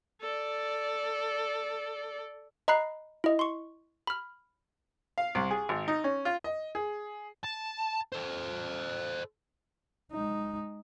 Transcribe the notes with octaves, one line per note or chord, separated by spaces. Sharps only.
A4 D5
D#5 A#5 B5 F#6 C7
E4 D#5
C6 C#6
B5 F6
F5
C2
G#4
G#1
D#4
C#4
F4
D#5
G#4
A5
A4 C5
G#3 D#4